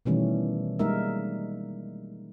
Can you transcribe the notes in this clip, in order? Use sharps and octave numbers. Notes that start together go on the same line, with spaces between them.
B2 D#3 E3 G3 A3 C#4
G3 G#3 A#3 D#4 A#4 E5